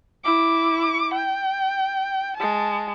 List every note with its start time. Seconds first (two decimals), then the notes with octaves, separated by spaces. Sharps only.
0.24 E4 D6
1.14 G5
2.37 G#3 A5